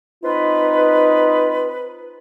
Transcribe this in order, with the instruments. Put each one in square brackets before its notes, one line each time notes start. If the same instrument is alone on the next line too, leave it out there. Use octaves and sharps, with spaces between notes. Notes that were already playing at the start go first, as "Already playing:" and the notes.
[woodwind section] C4 F4 B4 [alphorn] D#4